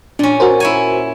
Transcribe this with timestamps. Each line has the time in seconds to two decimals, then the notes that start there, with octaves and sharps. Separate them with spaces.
0.19 A#2 C#4 D4
0.40 F#4 A#4 C5
0.60 E4 C#5 G#5